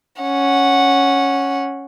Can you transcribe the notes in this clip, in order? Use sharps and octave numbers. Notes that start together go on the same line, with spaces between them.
C#4 F#5